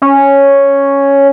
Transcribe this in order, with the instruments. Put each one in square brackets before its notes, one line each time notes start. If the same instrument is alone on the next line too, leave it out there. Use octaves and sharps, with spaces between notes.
[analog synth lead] C#4